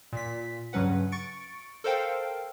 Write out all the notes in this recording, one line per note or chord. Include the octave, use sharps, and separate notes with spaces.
A#2 B6
G2 C#3 F#3 C#4 B4 F#5
C#6 A6 C#7 D7
A4 A#4 C5 F5 G5